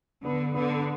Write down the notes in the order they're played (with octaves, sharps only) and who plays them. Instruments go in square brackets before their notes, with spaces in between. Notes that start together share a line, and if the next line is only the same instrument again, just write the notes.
[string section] D3 [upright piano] B3
[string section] D3 [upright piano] B3